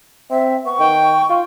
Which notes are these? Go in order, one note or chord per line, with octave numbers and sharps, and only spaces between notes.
C4 E5
B3 C#6
D#3 G5
F4